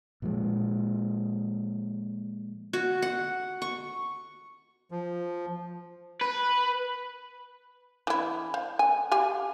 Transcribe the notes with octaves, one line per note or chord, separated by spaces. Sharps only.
A#2 F3 G#3
F#4
F#5
C#6
F3
B4
E3 E4
C5 F5
G#5
G4 F5 G#5